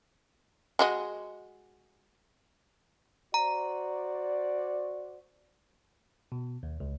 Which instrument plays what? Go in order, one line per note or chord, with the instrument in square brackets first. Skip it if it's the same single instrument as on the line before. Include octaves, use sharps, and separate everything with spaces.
[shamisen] G#3 F#4 D#5
[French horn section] F#4 C5 D5 [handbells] A#5
[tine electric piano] B2
D#2
C#2